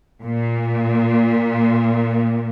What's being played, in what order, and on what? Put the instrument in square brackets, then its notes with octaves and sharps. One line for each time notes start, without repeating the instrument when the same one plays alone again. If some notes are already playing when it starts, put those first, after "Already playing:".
[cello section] A#2